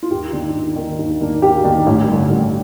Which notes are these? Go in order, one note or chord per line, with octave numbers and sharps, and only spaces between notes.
F4
D#2 G4
D#3 A#3 D4
D#2
D#3 A#3 D4
D#2
D#3 A#3 D4
D#2 G4
D#3 A#3 D4
A1
G2 D3
A1